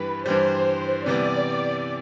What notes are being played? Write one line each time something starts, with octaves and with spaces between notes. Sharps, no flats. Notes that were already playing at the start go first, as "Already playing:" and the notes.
Already playing: G2 E3 G3 B4
G2 E3 G3 C5
C3 E3 G3 B3 D5